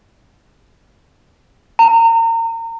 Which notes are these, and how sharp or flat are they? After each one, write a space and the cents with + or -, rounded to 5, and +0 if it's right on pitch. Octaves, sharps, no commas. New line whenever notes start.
A#5 -35